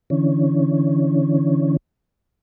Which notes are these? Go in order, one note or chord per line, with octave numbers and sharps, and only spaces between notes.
D3 E3 C#4